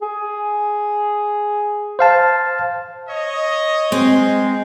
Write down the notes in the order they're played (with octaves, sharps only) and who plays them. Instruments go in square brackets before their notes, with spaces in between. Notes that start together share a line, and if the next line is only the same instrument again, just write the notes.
[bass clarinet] G#4
[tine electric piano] C5 F5 A5
[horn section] C#5 D#5
[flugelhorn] G#3 [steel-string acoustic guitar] C4